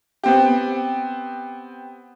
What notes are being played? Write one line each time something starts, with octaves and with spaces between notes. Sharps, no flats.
B3 C4 G4